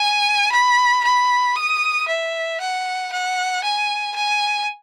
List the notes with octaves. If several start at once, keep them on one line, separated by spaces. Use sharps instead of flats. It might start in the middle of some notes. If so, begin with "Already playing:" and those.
Already playing: G#5
B5
B5
D#6
E5
F#5
F#5
G#5
G#5